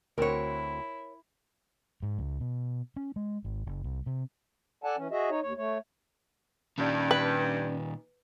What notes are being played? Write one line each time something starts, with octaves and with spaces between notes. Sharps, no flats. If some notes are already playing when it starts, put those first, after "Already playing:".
D2 C4 E4 F#4 A#4 C#5
G#2
C#2
B2
C#4
G#3
G#1
F#1
C2
C3
A4 D5 F#5 G#5 A5
E3 C#4
F#4 G#4 D#5 E5
D#4 C#5
D#2 C#5
A3 C#5
G2 A#2 D#3 C#4 D5
B4